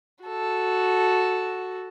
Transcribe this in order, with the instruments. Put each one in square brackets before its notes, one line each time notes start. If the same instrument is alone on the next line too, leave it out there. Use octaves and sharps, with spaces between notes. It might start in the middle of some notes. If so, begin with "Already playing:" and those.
[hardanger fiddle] F#4 A4